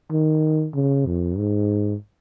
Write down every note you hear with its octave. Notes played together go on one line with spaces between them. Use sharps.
D#3
C#3
F2
G#2